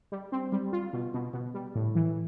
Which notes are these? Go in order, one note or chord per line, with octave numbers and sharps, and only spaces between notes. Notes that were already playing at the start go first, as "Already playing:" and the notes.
G3
C4
G3
F4
B2
B2
B2
G3
A2
E3